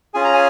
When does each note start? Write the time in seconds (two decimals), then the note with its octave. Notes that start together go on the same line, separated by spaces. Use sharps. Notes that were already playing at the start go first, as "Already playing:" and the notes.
0.14 C#4 F4 G#4 G#5
0.24 A#5
0.34 G#5